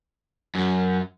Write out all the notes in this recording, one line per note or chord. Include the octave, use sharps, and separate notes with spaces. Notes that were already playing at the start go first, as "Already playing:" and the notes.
F#2